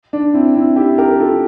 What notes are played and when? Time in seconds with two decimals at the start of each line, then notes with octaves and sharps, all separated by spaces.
0.13 D4
0.34 C4 E4
0.55 C4 E4
0.76 E4 G4
0.98 G4 A#4
1.11 A#4
1.19 F4 A4